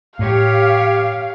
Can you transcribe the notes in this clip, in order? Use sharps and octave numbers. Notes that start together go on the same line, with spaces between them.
A2 G4 C#5 F5